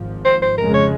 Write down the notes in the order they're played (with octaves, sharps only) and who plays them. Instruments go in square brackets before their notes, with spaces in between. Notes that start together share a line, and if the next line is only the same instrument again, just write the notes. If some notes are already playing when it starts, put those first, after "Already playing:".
Already playing: [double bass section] G#1 G#2 F3
[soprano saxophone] C5
C5
[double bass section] F1 F2 C#3 G#3 [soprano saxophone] A#4
[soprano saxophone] C#5